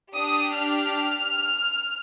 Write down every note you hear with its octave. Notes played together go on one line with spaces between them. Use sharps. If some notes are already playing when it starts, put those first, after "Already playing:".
D4 G4 D#6
F6